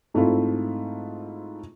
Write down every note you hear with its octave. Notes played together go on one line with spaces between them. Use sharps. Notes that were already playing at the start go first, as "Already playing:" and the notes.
G#2 A3 C4 E4 F4